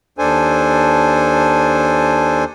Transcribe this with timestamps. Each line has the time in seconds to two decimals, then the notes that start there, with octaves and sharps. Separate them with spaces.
0.18 D#2 D4 A4 C5 G#5